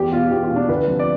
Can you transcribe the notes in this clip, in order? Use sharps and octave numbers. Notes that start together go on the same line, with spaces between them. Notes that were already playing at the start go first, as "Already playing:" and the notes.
Already playing: E2 G4
B2 F4
E2 G4
F4
B2
D4
D2 B4
C3 F3
D5